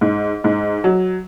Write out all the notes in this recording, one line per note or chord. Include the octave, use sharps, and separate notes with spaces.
G#2
G#2
F#3